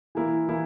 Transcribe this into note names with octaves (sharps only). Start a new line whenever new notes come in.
E3 A#3 E4
E3 A#3 E4